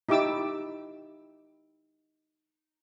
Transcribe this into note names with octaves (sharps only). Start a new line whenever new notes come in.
D#4 E4 G4 D6 E6